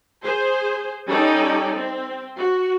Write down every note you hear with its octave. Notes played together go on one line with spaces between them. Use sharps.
G#4 C5
G3 C#4 D#4 A4 D5 G5
C4
F#4